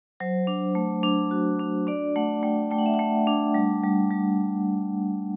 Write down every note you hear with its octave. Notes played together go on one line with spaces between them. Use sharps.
F#3 C5
D4
A3
D4
F#4
D4
D4 D5
A3 F#5
A3 G5
A3 G5
F#5
E5
F#5
A3
D4
G3
G3
G3